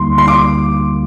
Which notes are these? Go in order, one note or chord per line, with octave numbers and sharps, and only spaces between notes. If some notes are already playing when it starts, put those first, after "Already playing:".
Already playing: D2 D3 G3 A#3 D#4 C6
C6
D6